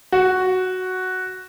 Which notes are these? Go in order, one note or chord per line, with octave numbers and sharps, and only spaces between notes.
F#4